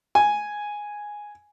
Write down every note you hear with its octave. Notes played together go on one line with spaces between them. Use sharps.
G#5